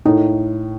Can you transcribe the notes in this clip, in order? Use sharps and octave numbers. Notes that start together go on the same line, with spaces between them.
A2 D#4